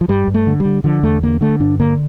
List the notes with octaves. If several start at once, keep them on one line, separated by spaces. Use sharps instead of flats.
F3
G2 G3
G2
A3
D3
G3
D3
D3 F3
E2 A3
D3 A#3
D3 A3
G2 D4
D3 A#3